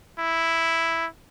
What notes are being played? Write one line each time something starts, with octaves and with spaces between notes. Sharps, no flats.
E4